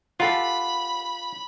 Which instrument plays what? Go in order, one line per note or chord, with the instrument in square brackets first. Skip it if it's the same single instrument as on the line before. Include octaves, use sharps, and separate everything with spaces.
[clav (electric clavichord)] F4 [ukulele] G4 A4 F#5 [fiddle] B5